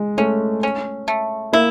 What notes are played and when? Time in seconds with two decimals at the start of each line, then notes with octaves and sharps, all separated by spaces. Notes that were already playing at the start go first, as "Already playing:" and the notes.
Already playing: G#3
0.18 A3 C#4
0.63 C#4
1.08 A3
1.53 A#3 E4